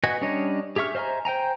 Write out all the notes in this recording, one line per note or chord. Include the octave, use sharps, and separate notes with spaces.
F#4 B4 D#5 G#5
G3 C#4 D4 C#5 D#5
G4 G#4 E5 C#6 F6
C5 D#5 E5 G#5 A#5
C5 G5 G#5 A#5